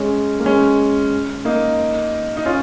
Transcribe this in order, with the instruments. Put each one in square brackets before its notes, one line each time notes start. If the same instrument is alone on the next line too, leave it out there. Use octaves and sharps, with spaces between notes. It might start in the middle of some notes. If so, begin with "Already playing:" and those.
Already playing: [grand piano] G#3 C#4
A#3
G#3 C#4
A#3 D#4
D#4
C#4 F4